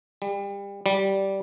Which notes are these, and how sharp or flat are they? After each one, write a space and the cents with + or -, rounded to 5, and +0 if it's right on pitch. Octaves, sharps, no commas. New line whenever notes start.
G3 +30
G3 -10